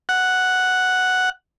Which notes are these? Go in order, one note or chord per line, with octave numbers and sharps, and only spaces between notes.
F#5